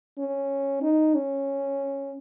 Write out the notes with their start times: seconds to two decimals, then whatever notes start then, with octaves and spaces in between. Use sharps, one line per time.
0.19 C#4
0.82 D#4
1.15 C#4